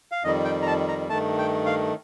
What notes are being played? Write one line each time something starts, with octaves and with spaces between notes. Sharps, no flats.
F5
F2 D#3 G3 D#5
G5
A#5
A5
A#5
G2 D#3 A3 A5
G5
F5